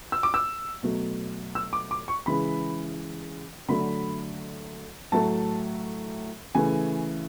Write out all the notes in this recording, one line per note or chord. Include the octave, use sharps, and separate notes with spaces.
E6
D6
E6
B2 F#3 A3
E6
D6
D6
C#6
C#3 E3 G#3 B5
D3 F#3 A3 B5
A2 F#3 A3 A5
C#3 E3 A3 G#5